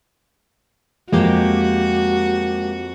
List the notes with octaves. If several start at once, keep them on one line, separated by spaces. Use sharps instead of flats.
F2 G#3 A#3 F#4 G4